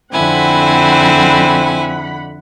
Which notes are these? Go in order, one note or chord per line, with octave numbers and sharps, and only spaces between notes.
F2 D3 C4 E4 F#5 G#5 B5